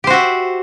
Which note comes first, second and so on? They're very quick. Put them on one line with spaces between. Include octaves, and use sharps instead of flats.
G4 C5 F#4 E5